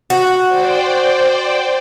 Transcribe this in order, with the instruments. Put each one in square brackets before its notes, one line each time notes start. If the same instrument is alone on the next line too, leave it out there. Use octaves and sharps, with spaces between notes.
[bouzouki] F#4
[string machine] C5 D5 G5